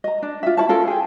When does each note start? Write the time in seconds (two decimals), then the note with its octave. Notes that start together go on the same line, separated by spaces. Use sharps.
0.04 D#5 A#5
0.22 D4
0.43 F4 E5
0.57 E4 C#5 A5
0.69 C#4 F4 A4 A#4
0.87 G#4 G5